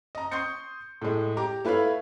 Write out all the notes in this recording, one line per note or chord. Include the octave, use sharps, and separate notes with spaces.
D#5 A#5
C6 C#6 D#6 G6 C#7
A2 G#3
G4 A#5 D6
A3 E4 B4 C#5 F5